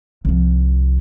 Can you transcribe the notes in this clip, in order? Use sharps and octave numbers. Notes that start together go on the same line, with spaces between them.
C2 F3